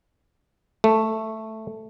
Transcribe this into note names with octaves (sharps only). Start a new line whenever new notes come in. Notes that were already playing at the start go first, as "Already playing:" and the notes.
A3